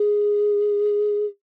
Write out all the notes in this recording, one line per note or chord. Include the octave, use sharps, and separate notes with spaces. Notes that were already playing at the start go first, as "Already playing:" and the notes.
Already playing: G#4